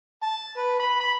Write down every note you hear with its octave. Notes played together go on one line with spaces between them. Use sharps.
A5
B4
B5
B5